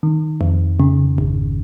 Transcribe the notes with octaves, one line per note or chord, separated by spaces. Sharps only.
D#3
F2
C#3
G#1